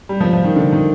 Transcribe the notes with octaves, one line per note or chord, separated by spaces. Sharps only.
G3
F3
F3
D#3
D3
D#3